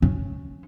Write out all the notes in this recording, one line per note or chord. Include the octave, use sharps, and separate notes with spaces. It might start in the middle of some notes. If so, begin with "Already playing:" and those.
C#4